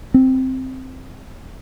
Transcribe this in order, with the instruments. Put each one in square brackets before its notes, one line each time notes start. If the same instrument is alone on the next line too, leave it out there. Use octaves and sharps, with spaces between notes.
[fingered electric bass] C4